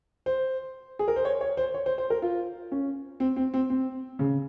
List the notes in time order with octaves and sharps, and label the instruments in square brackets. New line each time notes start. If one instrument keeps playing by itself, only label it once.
[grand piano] C5
G#4
A#4
C5
C#5
C#5
C5
C#5
C5
C5
A#4
F4
C#4
C4
C4
C4
C4
C#3